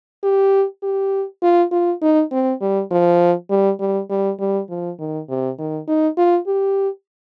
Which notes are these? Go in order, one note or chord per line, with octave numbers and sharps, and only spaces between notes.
G4
G4
F4
F4
D#4
C4
G3
F3
G3
G3
G3
G3
F3
D#3
C3
D#3
D#4
F4
G4